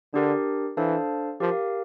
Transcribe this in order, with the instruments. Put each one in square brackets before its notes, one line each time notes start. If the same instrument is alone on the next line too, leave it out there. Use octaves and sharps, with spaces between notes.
[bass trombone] D3 [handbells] D4 G4 A#4
[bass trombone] E3 [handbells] D4 A4 C5 F5 A5
[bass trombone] F3 [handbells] G4 A#4 F5